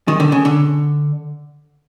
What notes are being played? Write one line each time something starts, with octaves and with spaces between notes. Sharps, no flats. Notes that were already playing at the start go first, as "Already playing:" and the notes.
D#3
D3
C#3
D3